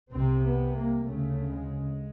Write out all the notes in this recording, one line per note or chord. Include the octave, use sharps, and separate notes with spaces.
C2 C3 C4
B3
A#3
D2 C#3 A3
G#3